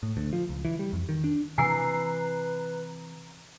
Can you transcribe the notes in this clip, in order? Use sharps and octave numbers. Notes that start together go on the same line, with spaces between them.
A2
D2
F3
C#2
E3
G3
F2
D#3
D4
C3 E3 B4 G#5 A#5 E6 C7